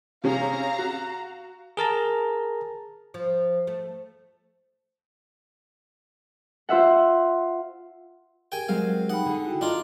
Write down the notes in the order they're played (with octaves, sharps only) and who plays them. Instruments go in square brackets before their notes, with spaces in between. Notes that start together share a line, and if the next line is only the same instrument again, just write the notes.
[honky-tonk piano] C3 C#4 G#4 [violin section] F5 A#5
[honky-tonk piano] F#4
[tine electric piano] G#4 A#4 A5 A#5
[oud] F3
A3
[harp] F4 C5 E5 F#5
[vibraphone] G4 G#4 A#4 [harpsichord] G5 G#5
[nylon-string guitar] F#3 G#3 C4 [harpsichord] F5
[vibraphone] D#4 G5 B5 [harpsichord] F#5
[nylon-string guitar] D3 G#4
[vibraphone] E4 F#4 G5
[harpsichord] D4 F4 [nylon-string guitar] D#4 [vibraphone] D5 D#5 A#5